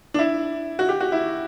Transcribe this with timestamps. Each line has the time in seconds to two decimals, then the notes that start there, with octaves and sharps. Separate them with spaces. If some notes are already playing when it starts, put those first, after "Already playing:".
0.14 D4
0.19 E4
0.79 F#4
0.89 G4
1.00 F#4
1.12 E4